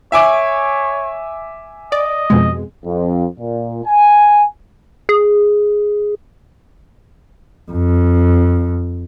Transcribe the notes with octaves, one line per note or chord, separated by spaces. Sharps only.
C#5 E5 G#5 D6
D5 D#5
F2 B2 G#3
F2
A#2
G#5
G#4
F2